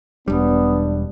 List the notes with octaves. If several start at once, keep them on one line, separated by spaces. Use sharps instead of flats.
E1 G3 B3 D4